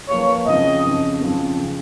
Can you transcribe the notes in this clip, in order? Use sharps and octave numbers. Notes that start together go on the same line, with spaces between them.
F3 A#3 F4 B4 C#5
F2 C#3 F3 D#5
F2 C#3 F3
F2 C#3 F3
C#3 F3